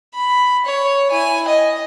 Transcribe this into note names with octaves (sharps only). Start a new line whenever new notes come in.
B5
C#5
E4 G#5
D#5